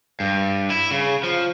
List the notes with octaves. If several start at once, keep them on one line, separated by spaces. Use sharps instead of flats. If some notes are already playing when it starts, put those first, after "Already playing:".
G2
E4
C#3
F3